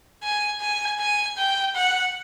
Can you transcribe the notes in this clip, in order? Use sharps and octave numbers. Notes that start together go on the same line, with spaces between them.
G#5
G#5
G#5
G5
F#5